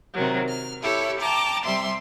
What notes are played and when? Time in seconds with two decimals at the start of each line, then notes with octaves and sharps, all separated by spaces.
0.13 C3 D#3 F#3
0.49 F6
0.81 E4 G4 A4 C#5
1.19 G5 A5 A#5 D6
1.64 C3 G3 E5 C6